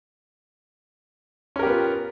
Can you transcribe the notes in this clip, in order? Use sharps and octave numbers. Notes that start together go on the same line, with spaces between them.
B3 C#4 F4 G4 A#4